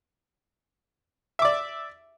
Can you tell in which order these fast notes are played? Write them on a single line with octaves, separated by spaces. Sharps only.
E5 D6 D5